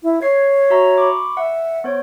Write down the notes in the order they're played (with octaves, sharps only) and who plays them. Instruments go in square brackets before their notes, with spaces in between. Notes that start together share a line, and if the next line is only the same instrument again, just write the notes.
[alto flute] E4
[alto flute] C#5 [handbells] G#6 C7
[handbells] F#4 E5 A#5
B5 C#6 D6
[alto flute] E5 [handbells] F#5
[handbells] B3 C5 C#5